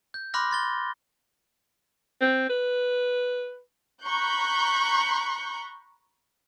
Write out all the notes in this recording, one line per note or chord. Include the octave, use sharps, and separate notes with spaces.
G6
B5 C6 D6 F6 F#6 A#6
C6 A6 G7
C4
B4
A#5 B5 C#6 F#6 G6